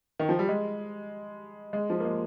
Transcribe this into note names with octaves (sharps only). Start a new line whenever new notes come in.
D#3
F3
G3
G#3
G#3
F3
A#3
G#3